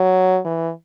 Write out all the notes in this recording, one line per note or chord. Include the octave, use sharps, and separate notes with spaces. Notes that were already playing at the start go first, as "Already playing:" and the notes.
Already playing: F#3
E3